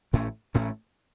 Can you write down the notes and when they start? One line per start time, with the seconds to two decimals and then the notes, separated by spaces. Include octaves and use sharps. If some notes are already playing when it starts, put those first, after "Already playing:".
0.13 A1 A2 A3 C#4
0.54 A1 A2 A3 C#4